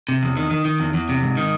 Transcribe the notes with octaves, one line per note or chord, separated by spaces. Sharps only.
C3
E2
D#3
D#3
D#3
E2
E2
C3
G#2
D#3